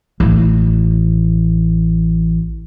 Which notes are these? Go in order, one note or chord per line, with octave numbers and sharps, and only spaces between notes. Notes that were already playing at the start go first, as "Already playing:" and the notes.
A1 D#4